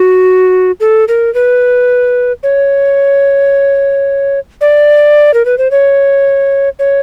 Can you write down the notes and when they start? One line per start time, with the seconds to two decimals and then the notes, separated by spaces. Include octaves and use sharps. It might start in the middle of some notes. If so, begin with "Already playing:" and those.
Already playing: F#4
0.80 A4
1.08 A#4
1.34 B4
2.43 C#5
4.61 D5
5.34 A#4
5.45 B4
5.58 C5
5.71 C#5
6.79 C#5